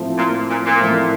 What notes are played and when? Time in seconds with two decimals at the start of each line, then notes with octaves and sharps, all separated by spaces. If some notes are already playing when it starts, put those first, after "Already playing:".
Already playing: A2 F3 A3 C4
0.18 A#2
0.50 A#2
0.66 A#2
0.81 A2 F3 A3 C4